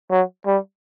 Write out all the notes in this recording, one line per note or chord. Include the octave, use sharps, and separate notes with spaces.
F#3
G3